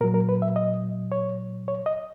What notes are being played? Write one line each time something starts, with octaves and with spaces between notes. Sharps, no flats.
A#2 F#3 A#4
A#4
B4
E5
D#5
C#5
C#5
D#5